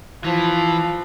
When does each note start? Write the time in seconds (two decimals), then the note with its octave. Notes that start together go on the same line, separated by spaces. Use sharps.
0.24 E3 F3